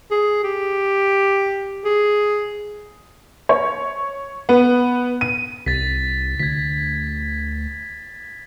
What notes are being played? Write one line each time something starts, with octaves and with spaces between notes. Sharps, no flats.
G#4
G4
G#4
C#5
B3
D#7
C2 A6 B6
D2 G#6 B6